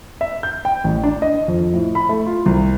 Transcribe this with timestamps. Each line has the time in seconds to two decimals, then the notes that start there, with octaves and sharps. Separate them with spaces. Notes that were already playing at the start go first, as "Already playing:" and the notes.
0.21 E5
0.43 G6
0.65 G5
0.84 A1
1.04 D4
1.22 D#5
1.48 F2
1.74 A2
1.95 B5
2.09 A3
2.26 F4
2.46 C2